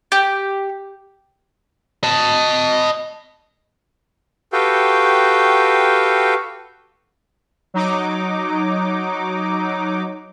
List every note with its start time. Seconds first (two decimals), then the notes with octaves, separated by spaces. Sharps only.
0.12 G4
2.03 D#5 A5
4.53 F#4 G4 A4 B4 F5 G5
7.74 F#3 D#4 D6